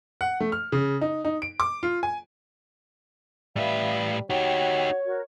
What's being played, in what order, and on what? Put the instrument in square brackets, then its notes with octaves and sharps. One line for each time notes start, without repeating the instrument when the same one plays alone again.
[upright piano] F#5
A3
F6
C#3
D#4
D#4
D7
D6
F4
G#5
[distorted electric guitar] A2 B4 [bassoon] G3 [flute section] E5 F5
[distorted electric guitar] D#4 G4 [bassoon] F#4 [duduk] C#5 [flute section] G5
[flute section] F#4 A#4